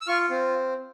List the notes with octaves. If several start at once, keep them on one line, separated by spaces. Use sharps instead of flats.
E6
F4 C#6 F6
C4